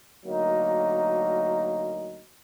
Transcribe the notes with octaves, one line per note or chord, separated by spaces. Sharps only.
D2 F#3 A#3 D#4